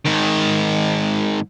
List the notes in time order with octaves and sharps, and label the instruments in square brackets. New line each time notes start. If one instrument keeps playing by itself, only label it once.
[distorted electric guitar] G#2 D#3